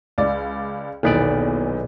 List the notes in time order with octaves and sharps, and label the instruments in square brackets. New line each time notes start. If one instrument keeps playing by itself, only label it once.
[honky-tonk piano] C#2 D5
[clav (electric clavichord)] B1 B3 D5 [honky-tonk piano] E2 A#2 D#3